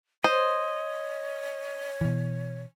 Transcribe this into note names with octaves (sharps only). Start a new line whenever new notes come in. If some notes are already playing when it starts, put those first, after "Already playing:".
C5 C#5 D#5
B2 E3